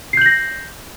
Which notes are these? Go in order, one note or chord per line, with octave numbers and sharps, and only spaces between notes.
G6 A#6 C7 F#7